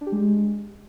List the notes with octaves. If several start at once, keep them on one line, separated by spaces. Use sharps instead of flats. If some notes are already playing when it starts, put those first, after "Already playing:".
D4
G4
G#3